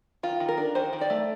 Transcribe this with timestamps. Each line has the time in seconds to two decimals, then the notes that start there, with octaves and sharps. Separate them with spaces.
0.23 D#3 F4
0.40 D#3
0.49 A#4
0.58 D4
0.75 D#3 C5
0.93 D#3
1.01 D5
1.10 A3